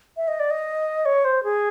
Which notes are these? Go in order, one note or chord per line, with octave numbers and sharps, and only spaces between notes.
E5
D#5
D5
D#5
C#5
C5
G#4